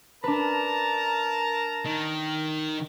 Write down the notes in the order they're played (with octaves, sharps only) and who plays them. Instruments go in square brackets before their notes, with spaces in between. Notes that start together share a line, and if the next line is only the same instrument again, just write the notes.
[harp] D4 B4 [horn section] A#4 A5 A#5
[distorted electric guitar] D#3